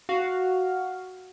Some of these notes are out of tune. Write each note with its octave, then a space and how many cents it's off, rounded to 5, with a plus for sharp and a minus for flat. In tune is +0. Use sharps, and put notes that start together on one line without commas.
F#4 +0 F5 +0